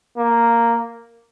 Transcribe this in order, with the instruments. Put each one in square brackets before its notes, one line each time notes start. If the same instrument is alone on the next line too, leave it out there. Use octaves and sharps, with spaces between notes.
[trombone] A#3